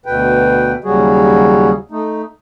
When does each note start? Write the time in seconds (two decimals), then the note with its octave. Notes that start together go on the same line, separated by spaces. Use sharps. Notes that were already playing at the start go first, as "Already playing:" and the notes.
0.06 D2 B2 B4 G5
0.84 D#2 C#3 F#3 G3 F#4 G#4
1.91 A3 D#4